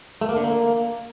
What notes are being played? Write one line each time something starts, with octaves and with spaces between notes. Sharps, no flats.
A3
A#3
D3
A#3